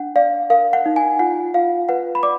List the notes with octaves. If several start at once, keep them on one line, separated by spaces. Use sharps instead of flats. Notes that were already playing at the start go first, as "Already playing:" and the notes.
Already playing: D4 F#5
D5 F5
A#4 F5
F#5
D#4
G#5
F4 F#5
F4 F5
B4 F#5
B5
D5 D6